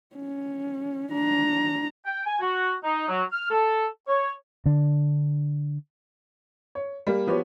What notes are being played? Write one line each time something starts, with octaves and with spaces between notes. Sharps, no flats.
C#4
D4 A#5
G5
G#5
F#4
D#4
F#3
F6
A4
C#5
D3 D4
C#5
G3 A#3
F3 B3 F#4 G4 C#5